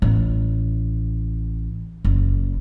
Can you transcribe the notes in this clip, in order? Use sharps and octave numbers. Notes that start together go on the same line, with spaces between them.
A1
F#1